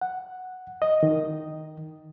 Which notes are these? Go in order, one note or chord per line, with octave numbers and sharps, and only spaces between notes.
F#5
D#5
D#3